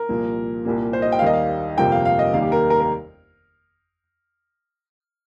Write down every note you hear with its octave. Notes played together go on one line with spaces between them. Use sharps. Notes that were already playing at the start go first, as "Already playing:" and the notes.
Already playing: A#4
C2 A#2 F3 A#3
C2 A#2 G3 A#3
C5
D#5
G5
F5
D#2 D#3 G3 A#3 D#5
F5
G1 F2 C3 F3 A#3 G5
F5
F5
D#5
D#2 D#3 G3 A#3 F5
G4
A#4
A#4
A#4